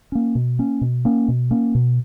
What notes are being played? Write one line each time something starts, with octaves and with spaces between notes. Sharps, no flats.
A#3 C#4
B2
A#3 C#4
B2
A#3 C#4
B2
A#3 C#4
B2